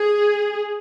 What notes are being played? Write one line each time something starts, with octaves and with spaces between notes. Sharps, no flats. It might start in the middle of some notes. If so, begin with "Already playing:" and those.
Already playing: G#4